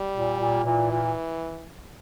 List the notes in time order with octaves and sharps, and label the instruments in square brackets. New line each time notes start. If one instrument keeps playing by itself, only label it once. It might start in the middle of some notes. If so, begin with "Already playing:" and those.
Already playing: [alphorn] G3
[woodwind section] A#2
A#2
[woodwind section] A#2 [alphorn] E3
[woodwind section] A#2